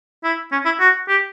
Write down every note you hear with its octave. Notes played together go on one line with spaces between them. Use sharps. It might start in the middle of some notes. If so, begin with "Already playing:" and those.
E4
C#4
E4
F#4
G4